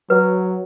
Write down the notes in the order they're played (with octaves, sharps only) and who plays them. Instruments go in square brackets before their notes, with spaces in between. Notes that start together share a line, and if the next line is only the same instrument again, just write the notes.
[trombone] F#3 [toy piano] B4